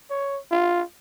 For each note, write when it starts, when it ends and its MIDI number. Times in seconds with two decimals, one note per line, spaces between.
0.10 0.39 73
0.52 0.83 65